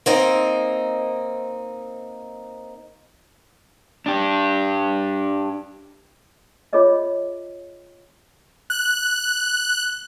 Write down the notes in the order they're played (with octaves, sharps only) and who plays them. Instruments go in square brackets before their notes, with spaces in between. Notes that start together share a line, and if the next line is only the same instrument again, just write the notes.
[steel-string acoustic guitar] A#3 C4 D#4
[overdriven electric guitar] D4 G4
[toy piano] F4 G#4 C#5 D#5 E5
[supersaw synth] F#6